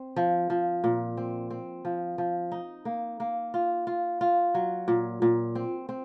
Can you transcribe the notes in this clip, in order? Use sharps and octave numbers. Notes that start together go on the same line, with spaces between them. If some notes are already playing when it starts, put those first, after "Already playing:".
Already playing: C4
F3
F3
A#2
C4
C4
F3
F3
D#4
A#3
A#3
F4
F4
F4
F#3
A#2
A#2
C4
C4